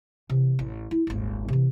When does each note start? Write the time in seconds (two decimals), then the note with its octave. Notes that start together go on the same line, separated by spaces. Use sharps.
0.30 C3 E3
0.59 A1
0.91 E4
1.07 D#1 G#1
1.48 C3 E3